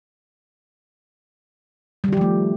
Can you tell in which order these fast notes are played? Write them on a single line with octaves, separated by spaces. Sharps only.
G3 D#3 G4 F3 A3